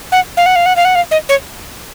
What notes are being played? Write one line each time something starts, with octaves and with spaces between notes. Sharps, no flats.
F#5
F5
F#5
F5
F#5
F5
F#5
F5
D#5
C#5